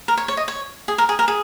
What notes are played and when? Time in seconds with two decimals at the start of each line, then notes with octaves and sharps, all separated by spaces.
0.08 A#4
0.17 C#5
0.28 C#5
0.37 D#5
0.48 C#5
0.88 G#4
0.98 A#4
1.09 G#4
1.19 A#4
1.28 G#4